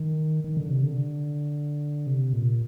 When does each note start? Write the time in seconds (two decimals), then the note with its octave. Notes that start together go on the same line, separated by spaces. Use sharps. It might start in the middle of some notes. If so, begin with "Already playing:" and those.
Already playing: D#3
0.44 D#3
0.57 D3
0.70 C3
0.83 D3
2.07 C3
2.33 A#2